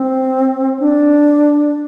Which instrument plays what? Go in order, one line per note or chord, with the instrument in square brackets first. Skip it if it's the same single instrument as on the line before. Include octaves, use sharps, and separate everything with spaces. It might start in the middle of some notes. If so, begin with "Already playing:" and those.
Already playing: [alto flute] C4
D4